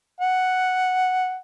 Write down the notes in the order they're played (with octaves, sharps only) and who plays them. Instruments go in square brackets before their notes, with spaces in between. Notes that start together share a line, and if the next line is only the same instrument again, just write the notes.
[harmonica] F#5